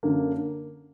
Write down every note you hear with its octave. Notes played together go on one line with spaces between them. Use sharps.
F#2 D3 A#3